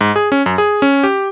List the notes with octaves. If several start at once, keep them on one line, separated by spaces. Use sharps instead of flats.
G#2
G#4
C#4
F#2
G#4
C#4
G4